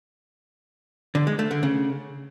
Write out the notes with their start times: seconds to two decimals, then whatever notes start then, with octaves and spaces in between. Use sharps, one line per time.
1.15 D3
1.27 G#3
1.39 A3
1.51 D3
1.63 C#3